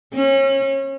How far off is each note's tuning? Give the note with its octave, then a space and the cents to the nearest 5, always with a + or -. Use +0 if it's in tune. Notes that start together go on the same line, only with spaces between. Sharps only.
C#4 -30